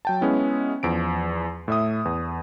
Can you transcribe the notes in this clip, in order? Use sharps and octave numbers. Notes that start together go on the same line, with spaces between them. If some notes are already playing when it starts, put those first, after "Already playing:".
F#3 G5 A5
G#3 B3 C#4 E4
E2 F3 D7
A2 E5 D#6
E2